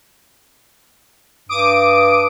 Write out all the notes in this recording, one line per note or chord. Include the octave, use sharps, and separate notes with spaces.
G2 D6 D#6 D7